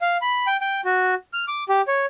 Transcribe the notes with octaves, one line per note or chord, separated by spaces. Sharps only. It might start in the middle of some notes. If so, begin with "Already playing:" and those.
F5
B5
G5
G5
F#4
F6
D6
G4
C#5